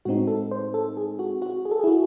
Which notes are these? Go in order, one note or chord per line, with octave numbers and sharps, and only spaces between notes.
A2 G#3 C4 D#4 F#4
A4
C5
A4
G#4
F#4
F#4
G#4
A4
G#4
E4
F#4